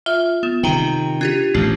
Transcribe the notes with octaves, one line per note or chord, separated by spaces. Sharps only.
F4 E5
B3 E7
C3 D#3 G5 A#5
D4 F4 G4 G#6
A1 E2 A3